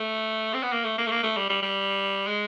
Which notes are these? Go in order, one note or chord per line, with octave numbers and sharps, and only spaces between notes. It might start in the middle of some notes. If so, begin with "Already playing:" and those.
Already playing: A3
C4
B3
A#3
A3
A#3
A3
A#3
A3
G3
G3
G3
G#3